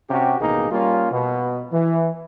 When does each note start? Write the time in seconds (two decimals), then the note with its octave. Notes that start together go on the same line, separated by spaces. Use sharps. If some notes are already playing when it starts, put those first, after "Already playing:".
0.10 C3 C#4 F#4 G4
0.40 A1 B2 D#3 A#3 D#4 G#4
0.71 G3 A#3 C#4 F4
1.12 B2
1.72 E3